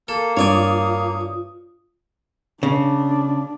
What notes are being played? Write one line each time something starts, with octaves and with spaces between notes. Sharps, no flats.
A#3 A4
G2 F4 C#5 D5 G#5 D#6
C#3 D4